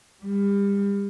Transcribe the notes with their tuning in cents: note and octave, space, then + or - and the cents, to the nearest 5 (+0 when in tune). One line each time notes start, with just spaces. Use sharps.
G3 +35